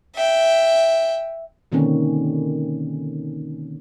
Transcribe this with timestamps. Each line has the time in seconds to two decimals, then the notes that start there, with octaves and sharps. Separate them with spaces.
0.15 E5 G5
1.72 B2 D3 D#3 A#3 C4 C#4